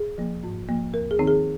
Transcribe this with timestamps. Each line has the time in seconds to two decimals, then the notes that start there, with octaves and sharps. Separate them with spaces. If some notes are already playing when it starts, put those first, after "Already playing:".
Already playing: G#4
0.18 F3 A#3
0.44 G#2
0.69 F3 A#3
0.93 D#2 A#4
1.11 G#4
1.19 D#3 C4 D#4
1.28 G#4